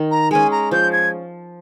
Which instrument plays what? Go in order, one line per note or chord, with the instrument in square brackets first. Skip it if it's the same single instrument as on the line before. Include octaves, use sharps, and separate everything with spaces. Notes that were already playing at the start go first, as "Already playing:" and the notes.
Already playing: [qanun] D#3
[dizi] A#5
[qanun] G#3 C#4 [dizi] G#5
[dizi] A#5
[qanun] F3 [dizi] G6
[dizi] G#6